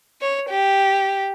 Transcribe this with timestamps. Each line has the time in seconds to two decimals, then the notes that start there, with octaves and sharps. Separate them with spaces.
0.21 C#5
0.50 G4